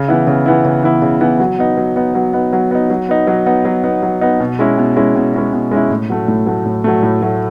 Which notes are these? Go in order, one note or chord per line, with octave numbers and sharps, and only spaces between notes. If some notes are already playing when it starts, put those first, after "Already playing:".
Already playing: C#3
E3 B3 E4
C#3
E3 B3 E4
C#3
E3 B3 E4
C#3
E3 B3 E4
F#3
B3 D#4
F#3
B3 D#4
F#3
B3 D#4
F#3
B3 D#4
F#3
B3 D#4
F#3
B3 D#4
F#3
B3 D#4
F#3
B3 D#4
B2
G#3 C#4 E4
B2
G#3 C#4 E4
B2
G#3 C#4 E4
B2
G#3 C#4 E4
A2
F#3 A3
A2
F#3 A3
A2
F#3 A3
A2
F#3 A3